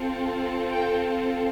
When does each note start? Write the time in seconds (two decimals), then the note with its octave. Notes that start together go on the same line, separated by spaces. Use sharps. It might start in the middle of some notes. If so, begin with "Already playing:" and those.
Already playing: C4 F4 A4
0.70 G5